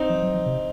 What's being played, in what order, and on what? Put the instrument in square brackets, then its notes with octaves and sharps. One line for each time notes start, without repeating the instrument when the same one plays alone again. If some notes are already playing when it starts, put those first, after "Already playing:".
Already playing: [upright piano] C4 D#4
[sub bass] F3
F#3
F3
C3